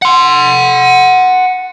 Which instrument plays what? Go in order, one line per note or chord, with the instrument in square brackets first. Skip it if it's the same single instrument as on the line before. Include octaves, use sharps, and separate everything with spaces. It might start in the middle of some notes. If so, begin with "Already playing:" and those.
[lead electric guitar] F#5 C6